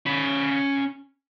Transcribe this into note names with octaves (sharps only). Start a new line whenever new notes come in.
C#4 B5